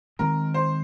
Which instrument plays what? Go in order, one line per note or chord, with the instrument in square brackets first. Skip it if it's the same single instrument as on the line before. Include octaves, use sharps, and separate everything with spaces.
[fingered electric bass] D#3 G#3 C4 [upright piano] A#4
[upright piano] C5